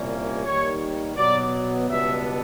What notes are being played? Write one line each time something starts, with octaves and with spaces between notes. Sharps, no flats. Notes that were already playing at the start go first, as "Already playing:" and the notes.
Already playing: C2 A#2 G3 A#3 C#4
D#2 D#3 G3 C#5
B2 F#3 B3 D5
C#2 B2 G3 B3 D4 E5